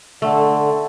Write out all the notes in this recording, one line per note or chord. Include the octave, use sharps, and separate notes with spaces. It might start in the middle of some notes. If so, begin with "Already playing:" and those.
D3 A3